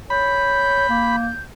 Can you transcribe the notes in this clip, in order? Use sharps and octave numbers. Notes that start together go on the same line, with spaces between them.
C#5 B5 G6
A#3